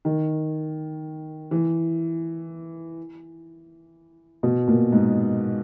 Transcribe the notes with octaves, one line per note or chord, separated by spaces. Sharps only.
D#3
E3
B2
A#2
G#2